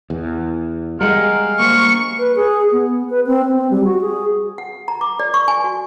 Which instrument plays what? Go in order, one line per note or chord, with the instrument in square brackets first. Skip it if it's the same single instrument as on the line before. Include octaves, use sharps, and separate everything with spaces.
[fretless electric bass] E2
[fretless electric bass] G3 G#3 [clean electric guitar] A#4 F#5 [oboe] F5
[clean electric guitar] A#3 C5 [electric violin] C#6
[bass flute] B4
G#4
B3
B4
C4
C4
G3
F#4
G#4
[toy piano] F#5
A#5
D6
D5
C#6
G#5
F#4